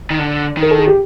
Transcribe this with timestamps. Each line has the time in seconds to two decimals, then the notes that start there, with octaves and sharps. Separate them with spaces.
0.10 D#3
0.19 D3
0.57 D#3
0.62 A#4
0.71 A4
0.78 G#4
0.87 G4